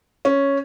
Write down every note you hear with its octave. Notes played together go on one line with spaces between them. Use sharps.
C#4